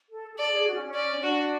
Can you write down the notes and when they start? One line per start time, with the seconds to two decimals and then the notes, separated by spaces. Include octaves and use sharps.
0.10 A4
0.34 G#4
0.38 A4 D5
0.52 G#4
0.67 F#4
0.75 C#4
0.86 C#4
0.94 D5
1.16 C#4
1.22 D4 F#4